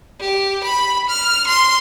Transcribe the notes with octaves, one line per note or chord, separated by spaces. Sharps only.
G4
B5
F6
C6